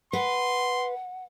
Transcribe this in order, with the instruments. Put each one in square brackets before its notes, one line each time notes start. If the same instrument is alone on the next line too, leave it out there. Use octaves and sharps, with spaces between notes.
[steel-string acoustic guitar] B4 [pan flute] F#5 [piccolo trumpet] C6